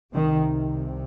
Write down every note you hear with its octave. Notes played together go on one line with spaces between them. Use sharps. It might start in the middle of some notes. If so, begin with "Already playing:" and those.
C2 C3 D#3